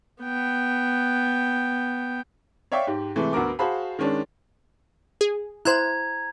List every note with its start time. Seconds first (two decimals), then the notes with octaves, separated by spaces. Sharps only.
0.22 B3 G5
2.72 C#5 D5 E5 F5 G5 C#6
2.87 G#2 G4
3.16 C3 E3 G#3 A3
3.33 D2 B3 F#4 A#4 D6
3.59 F#4 G#4 C5 F5 A5 B5
3.99 D#3 G#3 C#4 D4
5.21 G#4
5.65 E4 C5 A#5 F#6 G#6 E7